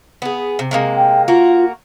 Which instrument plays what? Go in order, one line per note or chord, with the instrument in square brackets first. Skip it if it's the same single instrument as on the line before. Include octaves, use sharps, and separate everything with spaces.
[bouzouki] B3 G#4
C3
C3 G#3 A#3
[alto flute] G5
[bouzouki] A#3 F#4 A#4 [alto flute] F4